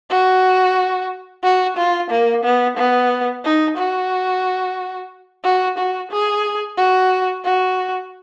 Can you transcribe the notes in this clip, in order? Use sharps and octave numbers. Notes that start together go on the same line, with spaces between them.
F#4
F#4
F4
A#3
B3
B3
D#4
F#4
F#4
F#4
G#4
F#4
F#4